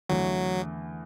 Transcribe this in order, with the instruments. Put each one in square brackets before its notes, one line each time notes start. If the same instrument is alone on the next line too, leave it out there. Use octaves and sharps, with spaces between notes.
[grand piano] E2 D3 A3 E4 [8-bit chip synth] F#3